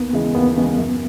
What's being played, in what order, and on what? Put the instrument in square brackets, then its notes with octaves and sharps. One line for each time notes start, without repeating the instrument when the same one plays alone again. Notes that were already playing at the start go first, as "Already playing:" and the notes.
Already playing: [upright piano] D#2 [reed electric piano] B3
[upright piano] C#3 E3 G#3
[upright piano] D#2 [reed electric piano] B3
[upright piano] C#3 E3 G#3
F#2